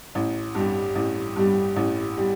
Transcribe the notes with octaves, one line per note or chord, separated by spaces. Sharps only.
A1
G2 G3
A1
G2 G3
A1
G3